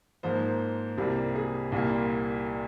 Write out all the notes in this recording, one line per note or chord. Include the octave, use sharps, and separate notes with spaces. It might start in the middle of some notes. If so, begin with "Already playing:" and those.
G#2 F3 A#3 C5
C2 C3 G3 A#3
G#4
C2 A#2 G3 A#3